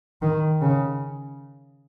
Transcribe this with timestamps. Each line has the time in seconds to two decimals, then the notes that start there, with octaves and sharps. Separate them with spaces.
0.22 D#3
0.61 C#3